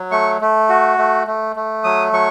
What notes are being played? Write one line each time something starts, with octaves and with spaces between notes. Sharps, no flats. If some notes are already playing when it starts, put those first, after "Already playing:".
Already playing: F#3
A3 C#6
A3
F#4
A3
A3
A3
F#3 D#6
F#3 C#6